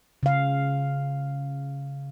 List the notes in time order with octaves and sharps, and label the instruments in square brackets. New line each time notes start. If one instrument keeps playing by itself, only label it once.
[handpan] C#3 F5